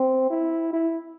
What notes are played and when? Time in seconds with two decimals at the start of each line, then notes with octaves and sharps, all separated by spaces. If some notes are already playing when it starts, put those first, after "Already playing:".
Already playing: C4
0.30 E4
0.73 E4